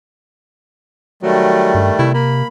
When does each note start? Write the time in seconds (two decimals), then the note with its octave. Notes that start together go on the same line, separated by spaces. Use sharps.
1.23 D#3 F#3 G3 A3
1.74 G2
1.99 C3 E4
2.14 A#3 B5